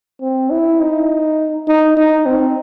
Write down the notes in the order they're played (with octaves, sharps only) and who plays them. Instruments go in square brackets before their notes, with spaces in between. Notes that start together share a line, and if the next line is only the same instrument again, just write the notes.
[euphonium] C4
E4
D#4
D#4
D#4
C4